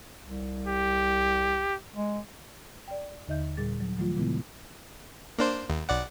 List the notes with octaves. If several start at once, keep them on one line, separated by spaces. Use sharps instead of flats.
C2
G4
G#3
D5 G5
D#2 D3 D#4 D#5 E5 G6
A#2 G3 G#4 A6
F#3
D#3 F3 F#3 A3 F4
A#2 C#3 E3 G#3 B3 E4
A#3 D4 C5
D#2
B1 D5 F#5